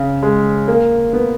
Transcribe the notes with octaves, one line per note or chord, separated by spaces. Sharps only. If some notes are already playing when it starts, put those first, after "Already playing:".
Already playing: C#3
G#3
A#3
B3